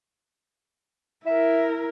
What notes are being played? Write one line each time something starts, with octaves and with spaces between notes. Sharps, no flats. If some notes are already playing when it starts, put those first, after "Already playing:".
E4 A#4 E5